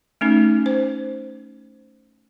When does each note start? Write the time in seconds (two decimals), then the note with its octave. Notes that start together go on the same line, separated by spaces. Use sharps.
0.21 A3 C#4 D#4
0.66 C5